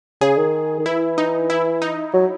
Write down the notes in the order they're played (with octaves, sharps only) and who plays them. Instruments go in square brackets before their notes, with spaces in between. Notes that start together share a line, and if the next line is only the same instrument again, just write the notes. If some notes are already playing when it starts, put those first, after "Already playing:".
[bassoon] C#3 [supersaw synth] G#4
[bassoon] D#3
D#3
[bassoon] E3 [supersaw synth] E4
[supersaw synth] D#4
E4
D#4
[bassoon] F#3